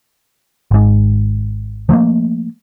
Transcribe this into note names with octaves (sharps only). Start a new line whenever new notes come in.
G#1 G#2
F3 F#3 A3 A#3